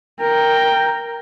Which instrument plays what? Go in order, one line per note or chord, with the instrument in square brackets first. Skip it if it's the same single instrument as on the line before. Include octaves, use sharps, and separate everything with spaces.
[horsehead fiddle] A#4 [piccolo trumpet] G5